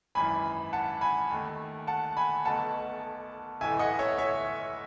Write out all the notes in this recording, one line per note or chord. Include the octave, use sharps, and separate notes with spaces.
G#1 F#2 E3 G#5 B5
F#5 A5
G#5 B5
D#2 D#3 A3
F#5 A5
G#5 B5
B1 B2 A3 F#5 A5
B1 A2 E3 A3 E5 G#5
D#5 F#5
C#5 E5
C#5 E5